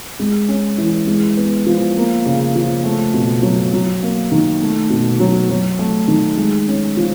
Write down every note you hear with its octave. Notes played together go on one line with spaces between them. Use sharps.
G#3
C#4
E3
G#3
B3
F3
A#3
C#3
F3
A3
B2
F#3
F#3
A#3
D#3
A3
B2
F#3
F#3
A3
D#3
G#3
C#4
F3